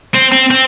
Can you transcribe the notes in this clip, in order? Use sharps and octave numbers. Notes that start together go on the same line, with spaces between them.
C4
C4
C4